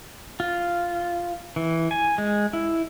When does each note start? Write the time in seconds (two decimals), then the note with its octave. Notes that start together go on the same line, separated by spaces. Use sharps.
0.40 F4
1.56 E3
1.91 G#5
2.18 G#3
2.53 E4